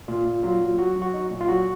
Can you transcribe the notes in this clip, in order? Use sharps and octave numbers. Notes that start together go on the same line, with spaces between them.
A#2 F4
A#2
F#3 F4
F#3
F#3 F#4
F#3
F#4
D#4
A#2
F4
F#3 F#4